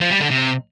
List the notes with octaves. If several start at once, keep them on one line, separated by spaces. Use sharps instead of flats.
F3
G3
D3
C3